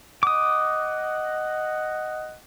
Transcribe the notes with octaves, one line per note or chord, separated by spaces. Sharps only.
D#5 F#5 D6 D#6